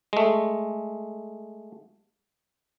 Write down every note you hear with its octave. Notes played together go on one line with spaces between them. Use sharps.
G#3 A3